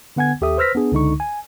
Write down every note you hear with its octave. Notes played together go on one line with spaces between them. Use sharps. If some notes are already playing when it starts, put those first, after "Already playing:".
D3 B3 F#5 G#5 G#6
D#2 G4 A4 E5 D#6
B4 C5 E6 F6 A#6 B6
B3 D4 G#4
C#2 D3 D#4 C#6
G#5